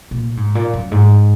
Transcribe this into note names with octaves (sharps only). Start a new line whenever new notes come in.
A#2
G#2
A#2
F#2
G#2